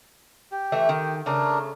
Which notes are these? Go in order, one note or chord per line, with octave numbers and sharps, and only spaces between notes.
G4
E3 A3 E5
D#3
C#3 A3 D4 A#4